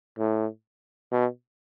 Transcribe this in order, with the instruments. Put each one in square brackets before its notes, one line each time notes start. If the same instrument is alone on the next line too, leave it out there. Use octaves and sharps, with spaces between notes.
[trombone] A2
B2